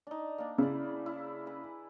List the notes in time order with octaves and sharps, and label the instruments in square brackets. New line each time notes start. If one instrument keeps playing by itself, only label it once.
[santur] D4 D#4
A#3 D4
[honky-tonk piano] C#3 [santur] E4 D5
[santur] E4
G#4 B4